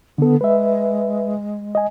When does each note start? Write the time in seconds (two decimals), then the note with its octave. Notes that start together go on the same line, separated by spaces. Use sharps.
0.18 D3 B3 A4
0.41 G#3 B4 E5
1.75 D#5 G#5